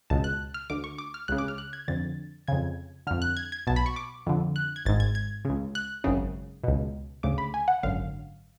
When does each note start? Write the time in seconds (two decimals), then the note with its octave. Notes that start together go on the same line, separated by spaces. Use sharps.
0.10 C#2 B2 A5
0.24 F#6
0.54 F6
0.70 D2 D3 D6
0.84 C#6
0.98 D6
1.14 F6
1.28 C#2 C#3 F#6
1.38 D6
1.48 F6
1.58 F#6
1.73 G#6
1.88 F2 D3 A6
2.48 F2 C#3 G#6
3.07 F2 D3 F6
3.22 F#6
3.37 G#6
3.52 G#6
3.67 B1 B2 A5
3.76 B5
3.86 C#6
3.96 D6
4.27 F2 D3
4.56 F#6
4.76 G#6
4.85 G#1 G#2 A6
5.00 G#6
5.15 G#6
5.45 C#2 C#3
5.75 F#6
6.04 G#1 F#2 C#3
6.64 C#2 B2
7.23 D2 C#3 D6
7.38 B5
7.54 G#5
7.68 F#5
7.83 G#1 F#2 D3 F5